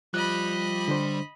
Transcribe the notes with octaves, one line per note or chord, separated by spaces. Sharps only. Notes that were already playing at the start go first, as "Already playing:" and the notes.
F3 G3 D#5 B5 F#6
D3 D4 C5